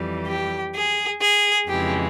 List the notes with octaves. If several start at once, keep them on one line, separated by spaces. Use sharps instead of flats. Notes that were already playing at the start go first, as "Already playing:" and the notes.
Already playing: F2 E3 G3
G4
G#4
G#4
F2 C#3 E3 G#3 G4